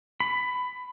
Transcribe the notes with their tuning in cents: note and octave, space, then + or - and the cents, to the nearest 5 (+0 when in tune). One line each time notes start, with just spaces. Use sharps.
B5 +15